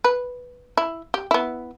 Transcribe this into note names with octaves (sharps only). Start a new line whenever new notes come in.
B4
E4
G4
B3 E4